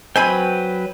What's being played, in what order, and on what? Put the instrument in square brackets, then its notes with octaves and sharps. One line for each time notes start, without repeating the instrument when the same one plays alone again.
[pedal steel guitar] F#3 B4 G5 [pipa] C4 G#5 B5